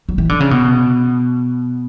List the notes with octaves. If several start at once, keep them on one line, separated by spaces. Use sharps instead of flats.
F#3
E3
D3
C#3
B2